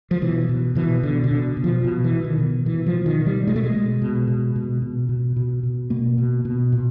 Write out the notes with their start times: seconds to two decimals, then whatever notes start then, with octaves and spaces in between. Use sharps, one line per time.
0.11 F3
0.22 B2 E3
0.49 B2
0.75 B2 E3
1.03 B2 D3
1.24 D3
1.31 B2
1.57 B2
1.64 F3
1.84 B2
2.04 E3
2.11 B2
2.24 D#3
2.38 B2
2.65 B2 E3
2.86 F3
2.93 B2
3.06 D#3
3.20 B2
3.26 G3
3.47 B2 G#3
3.56 A3
3.64 G#3
3.74 B2
4.02 B2
4.28 B2
4.56 B2
4.82 B2
5.09 B2
5.36 B2
5.63 B2
5.90 B2 A#3
6.18 B2
6.45 B2
6.72 A#2